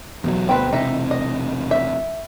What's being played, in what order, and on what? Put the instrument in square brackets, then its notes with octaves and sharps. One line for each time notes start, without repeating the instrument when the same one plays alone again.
[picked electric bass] E2 B2 F#3
[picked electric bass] D2 B2 [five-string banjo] C4 B4
[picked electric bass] E1 C3 [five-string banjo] D#4 E5
[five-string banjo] D#5
E5